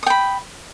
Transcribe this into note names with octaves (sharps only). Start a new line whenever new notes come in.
G5 B5 D#6